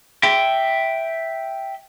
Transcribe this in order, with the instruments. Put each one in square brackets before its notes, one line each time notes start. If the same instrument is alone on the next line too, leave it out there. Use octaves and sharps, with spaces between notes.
[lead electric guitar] E5 G5